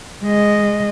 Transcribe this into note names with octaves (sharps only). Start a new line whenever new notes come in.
G#3 D#5